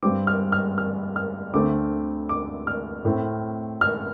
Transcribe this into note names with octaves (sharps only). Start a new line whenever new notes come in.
G2 G3 C4 D6
F6
F6
F6
F6
D2 D3 A3 C4 D6
D6
F6
A2 A3 C4
F6